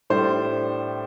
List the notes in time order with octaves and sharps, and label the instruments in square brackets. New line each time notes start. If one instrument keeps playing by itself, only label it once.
[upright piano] A2 G3 D4 C5